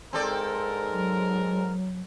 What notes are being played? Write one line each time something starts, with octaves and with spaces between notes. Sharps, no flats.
G#2 C4 A4 A#4 D5
F#3